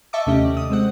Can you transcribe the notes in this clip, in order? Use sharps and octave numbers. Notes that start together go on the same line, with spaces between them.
D#5 E5 A5 C#6 D6
D#2 C3 A3 C#4 G4 D#5
D5
D#6
G#3 C4 F#5